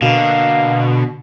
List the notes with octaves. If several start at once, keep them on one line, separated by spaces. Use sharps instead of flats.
B2 D3 A#3